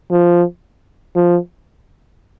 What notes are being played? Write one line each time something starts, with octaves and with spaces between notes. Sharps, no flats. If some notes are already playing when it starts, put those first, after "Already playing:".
F3
F3